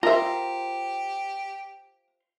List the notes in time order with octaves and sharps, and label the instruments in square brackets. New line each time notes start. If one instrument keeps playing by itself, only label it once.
[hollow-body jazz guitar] F4 C5 [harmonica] G4 [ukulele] A#4 [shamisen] D#5 E5